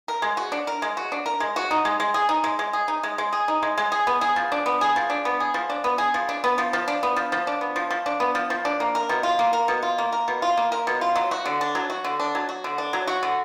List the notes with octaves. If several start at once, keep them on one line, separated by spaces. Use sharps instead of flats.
A#4
G#3
F#4
D4
A#4
G#3
F#4
D4
A#4
G#3
F#4
D#4
G#3
G#3
G#4
D#4
G#3
G#3
G#4
D#4
G#3
G#3
G#4
D#4
G#3
G#3
G#4
B3
G#4
F3
D4
B3
G#4
F3
D4
B3
G#4
F3
D4
B3
G#4
F3
D4
B3
F3
F3
D4
B3
F3
F3
D4
B3
F3
F3
D4
B3
F3
F3
D4
A#3
A#4
B2
F4
A#3
A#4
B2
F4
A#3
A#4
B2
F4
A#3
A#4
B2
F4
F#3
F#4
D3
D4
F#3
F#4
D3
D4
F#3
F#4
D3
D4
F#3
F#4
D3